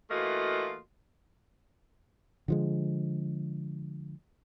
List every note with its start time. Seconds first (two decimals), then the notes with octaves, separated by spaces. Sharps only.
0.11 E3 A3 A#3 F4 F#4 D#5
2.48 D3 F3 G#3